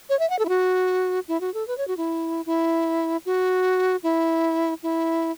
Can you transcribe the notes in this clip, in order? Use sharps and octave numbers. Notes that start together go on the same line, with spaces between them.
C#5
E5
F#5
A4
E4
F#4
E4
F#4
A4
B4
C#5
F#4
E4
E4
F#4
E4
E4